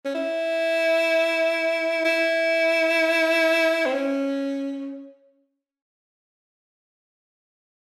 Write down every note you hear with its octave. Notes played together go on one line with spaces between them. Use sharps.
C#4
E4
E4
C4
C#4